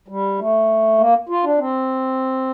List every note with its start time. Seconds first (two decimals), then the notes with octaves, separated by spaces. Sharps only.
0.08 G3
0.39 A3
0.99 A#3
1.29 F4
1.44 D4
1.59 C4